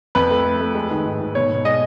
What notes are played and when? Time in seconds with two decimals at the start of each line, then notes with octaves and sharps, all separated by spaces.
0.15 F2 B4
0.31 A3
0.45 A3
0.60 A3
0.75 G#3
0.91 D#3
1.06 G#2
1.20 G#2
1.35 B2 C#5
1.50 B2
1.65 G#3 D#5